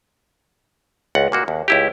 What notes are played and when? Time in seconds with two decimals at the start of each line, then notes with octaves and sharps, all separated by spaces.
1.15 C#2 F#5
1.32 A#2 A#3 F#4
1.48 D#2
1.68 C#2 E4 G4